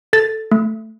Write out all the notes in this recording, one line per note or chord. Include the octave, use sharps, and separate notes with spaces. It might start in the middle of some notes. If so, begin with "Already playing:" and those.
A4 A6
A3